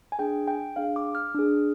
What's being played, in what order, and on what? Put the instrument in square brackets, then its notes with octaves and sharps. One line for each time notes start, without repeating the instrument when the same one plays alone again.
[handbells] G#5
D4 G#4 G5
G5
D4 G#4 F5
D6
F6
D4 G#4